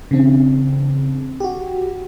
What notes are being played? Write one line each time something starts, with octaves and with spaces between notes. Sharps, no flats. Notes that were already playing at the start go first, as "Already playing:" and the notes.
C#3 E3 C4 D4
F#4 G4